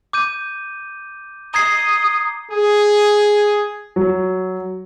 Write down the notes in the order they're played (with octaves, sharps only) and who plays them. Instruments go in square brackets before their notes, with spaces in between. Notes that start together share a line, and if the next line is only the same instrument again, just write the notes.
[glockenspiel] D6 G6 D#7
[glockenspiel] A#5 G#6 C7 [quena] D#6
[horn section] G#4
[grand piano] F#3